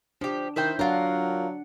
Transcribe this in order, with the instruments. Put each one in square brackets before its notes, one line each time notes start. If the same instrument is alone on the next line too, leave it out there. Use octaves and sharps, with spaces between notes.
[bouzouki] F3 G4 [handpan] D4
[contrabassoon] D#3 [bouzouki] E4 C5 G5
[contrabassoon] F#3 [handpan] D4 F#5 [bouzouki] F4 A#4